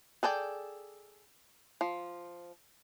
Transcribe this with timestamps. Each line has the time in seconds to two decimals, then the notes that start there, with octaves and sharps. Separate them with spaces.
0.23 G#4 A4 D5 G5
1.81 F3